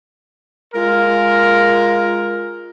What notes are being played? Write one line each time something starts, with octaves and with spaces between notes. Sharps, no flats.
G#3 F4 A#4